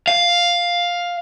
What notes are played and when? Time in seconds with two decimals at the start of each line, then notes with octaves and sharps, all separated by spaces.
0.08 F5